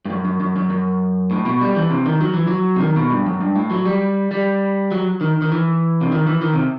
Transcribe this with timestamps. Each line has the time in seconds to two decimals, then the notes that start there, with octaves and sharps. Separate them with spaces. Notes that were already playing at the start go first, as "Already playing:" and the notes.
0.05 G2
0.11 F#2
0.25 F#2
0.40 F#2
0.56 F#2
0.70 F#2
1.31 A2
1.46 B2
1.61 G3
1.76 E3
1.90 C3
2.06 D#3
2.21 F#3
2.34 E3
2.47 F#3
2.76 C3
2.81 D#3
2.96 B2
3.10 G2
3.26 F#2
3.41 G2
3.56 A2
3.71 F#3
3.86 G3
4.31 G3
4.91 F#3
5.21 D#3
5.42 D#3
5.52 E3
6.01 C3
6.12 D#3
6.27 E3
6.42 D#3
6.54 C3